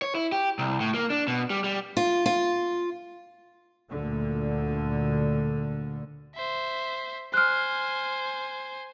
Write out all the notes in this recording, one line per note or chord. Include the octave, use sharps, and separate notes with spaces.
C#5
E4
G4
C2
A2
A#3
D4
B2
G3
G3
F4
F4
D2 A#2 D3
C5 E5
C5 G#5 F6 F#6